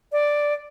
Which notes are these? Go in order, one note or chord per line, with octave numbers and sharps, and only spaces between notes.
D5